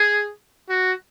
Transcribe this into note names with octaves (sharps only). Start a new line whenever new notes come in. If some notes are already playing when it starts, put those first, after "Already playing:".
Already playing: G#4
F#4